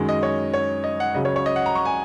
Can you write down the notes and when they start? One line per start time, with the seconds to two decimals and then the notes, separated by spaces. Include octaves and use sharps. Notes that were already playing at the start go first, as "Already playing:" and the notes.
Already playing: F#2 D#3 G#3
0.09 D#5
0.23 C#5
0.54 C#5
0.84 D#5
1.00 F#5
1.14 C#2 C#3 F#3 D#5
1.25 C#5
1.36 C#5
1.46 D#5
1.56 F#5
1.66 A#5
1.75 C#6
1.85 G#5